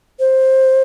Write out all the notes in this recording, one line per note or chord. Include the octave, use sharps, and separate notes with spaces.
C5